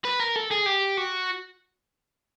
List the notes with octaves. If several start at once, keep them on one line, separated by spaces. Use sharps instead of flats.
B4
A#4
A4
G#4
G4
F#4